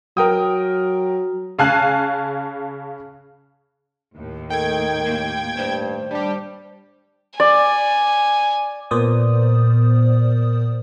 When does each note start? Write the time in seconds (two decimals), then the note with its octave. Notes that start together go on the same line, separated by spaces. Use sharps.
0.17 F#3 A#4 G5 D#6
1.59 C#3 F5 G#5 A5 F#6
4.16 D#2 A2
4.50 D#3 A4 G5 G#6
5.05 A#3
5.57 G2 C5
6.11 G3 D4 G4
7.40 D5 G#5
8.91 A#2 B3 A#4 C5 D5 D#6